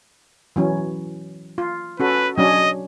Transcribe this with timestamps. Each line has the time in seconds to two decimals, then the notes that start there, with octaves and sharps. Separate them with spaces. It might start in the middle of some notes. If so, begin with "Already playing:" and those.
0.56 E3 F#3 C#4
1.58 F4
2.00 C#4 F#4 A4 B4
2.38 F#3 C#4 D4 D#5